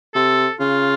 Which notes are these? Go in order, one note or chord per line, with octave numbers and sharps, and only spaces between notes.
C3 A4
C#3 F4